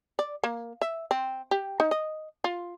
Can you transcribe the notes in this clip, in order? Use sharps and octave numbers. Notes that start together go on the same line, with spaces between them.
D5
A#3
E5
C4
G4
D#4
D#5
F4